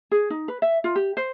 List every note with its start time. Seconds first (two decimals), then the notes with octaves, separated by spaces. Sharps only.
0.11 G#4
0.30 D#4
0.48 B4
0.62 E5
0.84 F4
0.96 G4
1.17 C5